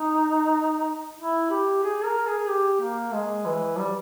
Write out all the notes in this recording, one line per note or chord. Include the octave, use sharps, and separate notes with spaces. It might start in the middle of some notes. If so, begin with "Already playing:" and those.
Already playing: D#4
E4
G4
G#4
A#4
G#4
G4
A#3
G#3
E3
G3